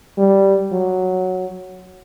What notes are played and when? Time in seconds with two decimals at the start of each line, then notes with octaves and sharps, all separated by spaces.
0.18 G3
0.72 F#3